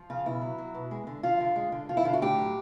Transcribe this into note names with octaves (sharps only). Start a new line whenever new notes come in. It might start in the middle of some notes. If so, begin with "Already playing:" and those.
Already playing: F3
C#3 F4
B2 E4
F#3
F#3
B2
G#3
D3
F3 F4
D3
G#3
D3
F3 F4
E4
D3 F4
F#4
A2 G4
F#3